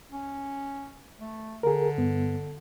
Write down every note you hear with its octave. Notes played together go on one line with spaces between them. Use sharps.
C#4
A3
D3 G#4 A#4
G2 B3